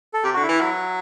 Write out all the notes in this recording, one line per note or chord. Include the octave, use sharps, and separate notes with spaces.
A4
C3 G4
D3 F#4
E4
E3
F#3